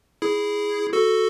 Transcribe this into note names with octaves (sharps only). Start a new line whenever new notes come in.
E4 G#4
F#4 A4